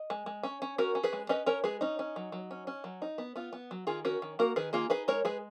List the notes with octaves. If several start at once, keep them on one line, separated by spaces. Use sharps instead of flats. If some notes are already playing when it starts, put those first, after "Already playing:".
Already playing: D#5
G#3
G#3
C#4
C#4
C#4 F#4 A#4
C#4
G#4 B4
G#3
C#4 B4 D#5
C#4 A#4 C#5
G#3 G#4 B4
C#4 D#4
C#4
F#3
F#3
C#4
C#4
F#3
D#4
B3
B3 F4
B3
F#3
D#3 F4 G#4
C#4 F#4 A#4
D#3
A#3 F#4 A#4
D#3 G#4 B4
A#3 F4 G#4
D#4 G#4 B4
G#3 A#4 C#5
G#3 G#4 B4